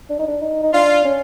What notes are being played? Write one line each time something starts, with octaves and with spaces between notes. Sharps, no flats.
D4
D#4
D4
D#4
D#4
D4 F4
C#4